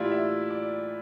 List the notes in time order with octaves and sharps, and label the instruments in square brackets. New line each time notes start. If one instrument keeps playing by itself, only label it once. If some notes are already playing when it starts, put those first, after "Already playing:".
Already playing: [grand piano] A2 E3 G3 A#3 E4 F4 G4 D5
E5
D5